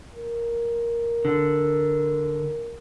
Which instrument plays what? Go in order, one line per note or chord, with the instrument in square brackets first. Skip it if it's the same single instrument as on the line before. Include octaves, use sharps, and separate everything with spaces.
[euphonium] A#4
[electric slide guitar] D3